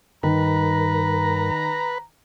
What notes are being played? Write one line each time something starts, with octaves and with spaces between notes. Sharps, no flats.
G2 D#3 A#4 B4 A#5